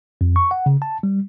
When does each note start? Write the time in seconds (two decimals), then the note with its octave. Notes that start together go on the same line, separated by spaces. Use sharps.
0.21 F2
0.36 C#6
0.51 F#5
0.66 C#3
0.82 A5
1.03 G3